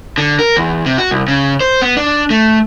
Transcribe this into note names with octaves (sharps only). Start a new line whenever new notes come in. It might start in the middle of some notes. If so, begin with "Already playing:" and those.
D3
A#4
E2
C3
F#4
C2
C#3
C5
B3
D4
A3